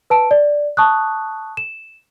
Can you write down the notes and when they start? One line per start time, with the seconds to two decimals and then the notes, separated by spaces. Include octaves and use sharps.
0.10 B4 A5 D7
0.31 D5
0.77 A5 C#6 D#6 F#6
1.57 E7